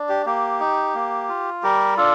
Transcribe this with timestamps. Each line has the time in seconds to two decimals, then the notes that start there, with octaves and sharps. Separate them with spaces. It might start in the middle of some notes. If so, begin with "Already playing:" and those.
Already playing: D4
0.09 G4
0.26 A#3 G4
0.60 D#4
0.94 A#3
1.29 F4
1.63 G3 G4 A#4
1.97 D4 F4 A4